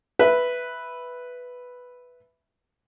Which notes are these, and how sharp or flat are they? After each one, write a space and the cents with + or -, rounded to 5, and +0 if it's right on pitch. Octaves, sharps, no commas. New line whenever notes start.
B4 +0 E5 +0